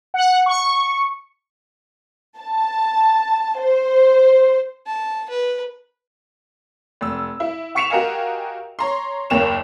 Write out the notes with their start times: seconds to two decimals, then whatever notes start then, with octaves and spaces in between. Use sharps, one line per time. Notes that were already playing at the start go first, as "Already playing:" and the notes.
0.14 F#5
0.46 C#6
2.39 A5
3.59 C5
4.86 A5
5.30 B4
7.01 F1 E6
7.40 E4
7.75 F#5 C#6 B6 C#7 E7 F7
7.90 F#4 G4 A#4 D#5 F5 G#5
8.79 C#5 A#5 C6
9.30 F#1 D#2 A#3 C#5 E7 F7